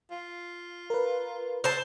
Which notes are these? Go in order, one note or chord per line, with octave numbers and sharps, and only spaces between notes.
F4
A#4 B4
C5 A5 E6 F#6